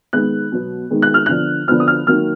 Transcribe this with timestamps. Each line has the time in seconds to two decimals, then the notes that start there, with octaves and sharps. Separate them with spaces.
0.13 D#3 G#3 B3 F#6
0.52 B2 F#3 B3
0.90 D#3 G#3 B3
1.02 F#6
1.14 F6
1.26 D3 F3 B3 F#6
1.68 D3 F3 B3 F6
1.80 D#6
1.88 F6
2.07 D#3 F#3 A#3 F6